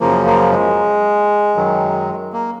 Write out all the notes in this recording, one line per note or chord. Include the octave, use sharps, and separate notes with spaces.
F#2 C#3 F3 A#3
A#3
G#3
F#2 D#3 F#3
A#3